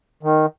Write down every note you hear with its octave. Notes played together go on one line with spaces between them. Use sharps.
D#3